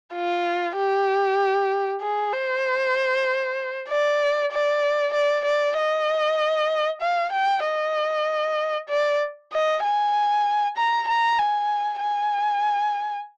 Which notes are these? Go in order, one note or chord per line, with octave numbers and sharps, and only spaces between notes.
F4
G4
G#4
C5
D5
D5
D5
D5
D#5
F5
G5
D#5
D5
D#5
G#5
A#5
A#5
G#5
G#5